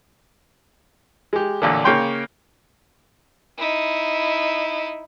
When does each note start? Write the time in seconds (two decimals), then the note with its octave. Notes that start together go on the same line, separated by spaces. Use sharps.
1.33 G#3 G4
1.62 A1 A#2 D3
1.85 C#3 A#3 C#5 G5 C6
3.57 D#4 E4